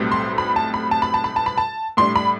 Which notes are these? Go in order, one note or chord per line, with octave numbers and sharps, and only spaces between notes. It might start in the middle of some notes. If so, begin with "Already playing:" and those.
Already playing: B1 A2 G3 C4
C6
B5
A5
B5
A5
B5
A5
B5
A5
B5
A5
A2 G3 D4 C6
B5